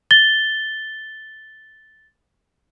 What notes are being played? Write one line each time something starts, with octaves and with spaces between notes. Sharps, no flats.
A6 G7